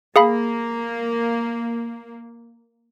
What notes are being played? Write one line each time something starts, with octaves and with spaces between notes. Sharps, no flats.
A#3 G#4 F5 B5